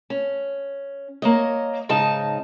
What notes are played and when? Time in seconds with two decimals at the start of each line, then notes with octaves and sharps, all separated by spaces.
0.10 C#4
1.22 A#3 C#5 D#5
1.89 G#2 C#3 D#4 D#5 A5